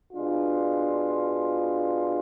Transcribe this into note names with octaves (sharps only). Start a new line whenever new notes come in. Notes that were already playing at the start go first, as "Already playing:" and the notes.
B2 G#3 D4 F4